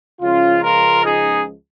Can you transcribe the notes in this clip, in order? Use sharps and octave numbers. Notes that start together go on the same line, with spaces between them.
C#2 C#3 F3 G#3 C#4 F4
F4 A#4
D#4 G#4